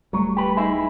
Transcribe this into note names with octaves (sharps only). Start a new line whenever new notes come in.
D1 F#3 G3 A3
G4 B4
D#4 E4 G#4